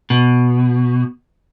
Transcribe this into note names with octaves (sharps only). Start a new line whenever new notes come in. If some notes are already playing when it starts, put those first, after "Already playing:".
B2